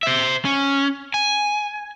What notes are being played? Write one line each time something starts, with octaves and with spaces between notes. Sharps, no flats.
C5 E5
C#4
G#5